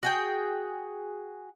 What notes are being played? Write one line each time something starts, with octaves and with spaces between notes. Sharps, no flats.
F#4 G#4 G5